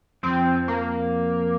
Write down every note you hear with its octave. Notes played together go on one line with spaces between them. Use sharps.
F2 F3 C4
A#3